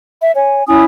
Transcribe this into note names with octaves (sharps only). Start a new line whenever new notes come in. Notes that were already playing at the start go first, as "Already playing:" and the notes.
E5
C#5 G#5
C#4 E4 G#5 D#6